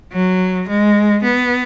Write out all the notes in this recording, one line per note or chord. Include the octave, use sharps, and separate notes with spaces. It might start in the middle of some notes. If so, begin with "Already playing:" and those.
F#3
G#3
B3